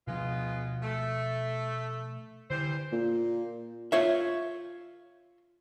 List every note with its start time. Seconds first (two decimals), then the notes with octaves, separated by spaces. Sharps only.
0.07 B2 F3 G#3 B3 D4 F4
0.82 A3
2.50 D3 E3 G3 C5
2.92 A#2
3.92 F4 C#5 E5